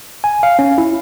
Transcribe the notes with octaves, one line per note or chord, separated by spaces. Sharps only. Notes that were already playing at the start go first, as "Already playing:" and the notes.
G#5
F5
C#4
E4